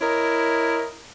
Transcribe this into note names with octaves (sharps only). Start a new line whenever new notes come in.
E4 A#4 C#5 D#5